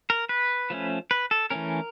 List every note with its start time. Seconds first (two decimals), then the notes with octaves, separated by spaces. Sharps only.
0.10 A#4
0.29 B4
0.70 F3 A3 C#4
1.11 B4
1.31 A4
1.50 E3 A3 C#4 A#4